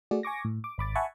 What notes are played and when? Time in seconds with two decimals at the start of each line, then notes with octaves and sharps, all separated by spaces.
0.11 A3 F#4 G#4 D5
0.23 G#5 C#6 D6 A#6
0.45 A2
0.64 D6
0.78 G#1 B5 D6 A6
0.95 E5 F#5 G#5 A5 B5 C#6